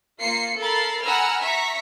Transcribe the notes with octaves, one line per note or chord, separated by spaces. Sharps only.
A#3 F4 C7 C#7
A4 A#4 B5 A6 C7
F#5 G#5 A#5 B5 E6 F6
E5 A#5 C#6 B6